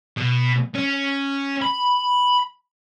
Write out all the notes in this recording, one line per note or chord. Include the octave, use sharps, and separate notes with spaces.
B2
C#4
B5